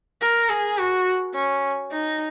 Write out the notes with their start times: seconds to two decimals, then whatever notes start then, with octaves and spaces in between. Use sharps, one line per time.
0.21 A#4
0.49 G#4
0.78 F#4
1.34 C#4
1.91 D#4